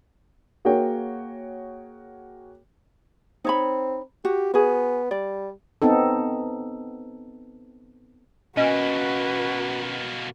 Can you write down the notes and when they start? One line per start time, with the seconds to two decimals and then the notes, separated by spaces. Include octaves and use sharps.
0.65 A#3 F#4 G#4 C#5 G5
3.45 C4 D#4 C#5 B5
4.25 F#4 G4
4.54 B3 F#4 G#4
5.11 G3 D5
5.82 B3 C4 D#4 A4
8.57 B2 A#3 C#4 F#4 B4 D#5